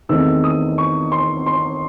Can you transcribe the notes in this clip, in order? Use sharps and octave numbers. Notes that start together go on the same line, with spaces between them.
E2 D#3 A3 C4 E6
D#6
C#6
C6
C6